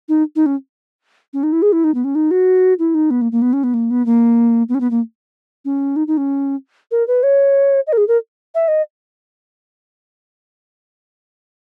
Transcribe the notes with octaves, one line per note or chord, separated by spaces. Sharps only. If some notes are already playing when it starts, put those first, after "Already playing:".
D#4
D#4
C#4
C#4
D#4
E4
G#4
E4
D#4
B3
C#4
D#4
F#4
E4
D#4
B3
A#3
A#3
B3
C#4
B3
A#3
B3
A#3
B3
C#4
B3
A#3
C#4
D#4
D#4
C#4
A#4
B4
C#5
D#5
A#4
G#4
A#4
E5
D#5